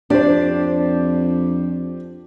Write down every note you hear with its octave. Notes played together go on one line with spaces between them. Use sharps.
F2 D4 G4 C5